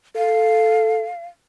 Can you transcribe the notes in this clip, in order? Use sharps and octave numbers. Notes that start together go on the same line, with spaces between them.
A4 F5